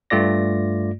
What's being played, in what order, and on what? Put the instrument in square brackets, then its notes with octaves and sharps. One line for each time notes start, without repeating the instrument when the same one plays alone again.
[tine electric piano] G2 A3 F4 D5 A#6